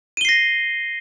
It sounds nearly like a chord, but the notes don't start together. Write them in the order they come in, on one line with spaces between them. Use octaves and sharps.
D#7 G7 C7 A#6